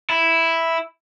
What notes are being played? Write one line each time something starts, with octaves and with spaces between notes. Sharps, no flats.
E4